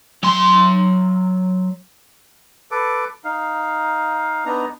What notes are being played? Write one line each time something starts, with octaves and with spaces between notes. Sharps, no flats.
F#3 C6
A4 B4 D6
D#4 F5
B3 D4 D#4 A#5